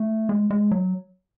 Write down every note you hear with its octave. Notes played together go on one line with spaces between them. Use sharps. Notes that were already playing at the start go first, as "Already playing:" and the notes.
Already playing: A3
G#3
G#3
F#3